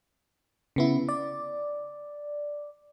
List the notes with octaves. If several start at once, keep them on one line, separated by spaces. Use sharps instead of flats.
C#3 B3 E4
D5